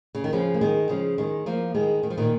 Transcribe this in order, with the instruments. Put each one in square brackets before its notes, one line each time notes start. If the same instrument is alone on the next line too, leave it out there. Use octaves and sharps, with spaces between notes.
[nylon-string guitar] C#3
D#3
C#3 F3
A#3
D#3 G#3
C#3 F3
D#3 G#3
F3 A#3
D#3 G#3
D#3
F3
A#2 D#3